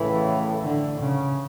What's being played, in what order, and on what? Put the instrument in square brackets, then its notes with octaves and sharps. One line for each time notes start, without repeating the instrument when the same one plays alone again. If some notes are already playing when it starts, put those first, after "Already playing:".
Already playing: [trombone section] A2 C#3 [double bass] E3
[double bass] D3
C#3